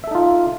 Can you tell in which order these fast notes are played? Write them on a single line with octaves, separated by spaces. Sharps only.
E5 A4 D#4 F4